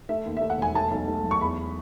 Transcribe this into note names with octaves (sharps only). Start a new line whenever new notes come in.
A3 E5
D#2
A3 E5
F#5
E1 G#5
A3 A5
B1
A3
F#3
C#6
E2 B5